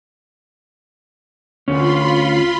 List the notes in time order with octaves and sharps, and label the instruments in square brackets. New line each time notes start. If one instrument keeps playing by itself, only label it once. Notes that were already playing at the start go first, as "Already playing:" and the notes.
[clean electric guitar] D2 C#4 [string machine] F4 B5 C6